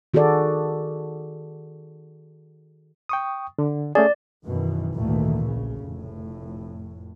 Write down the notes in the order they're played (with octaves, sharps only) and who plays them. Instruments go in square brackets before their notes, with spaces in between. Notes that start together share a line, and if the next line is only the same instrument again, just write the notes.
[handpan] D#3 F#4 G#4 A4 D5
[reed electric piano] G5 C#6 D#6
D3
[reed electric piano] A3 C#4 G#4 [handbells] D5
[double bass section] F#2 B2 D#3 E3
G#1 D2 A#2 D#3 E3 A3
A#1 C#3
F1 A2